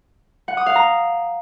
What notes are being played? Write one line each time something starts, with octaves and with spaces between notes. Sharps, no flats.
F#5
D#6
F5
A#5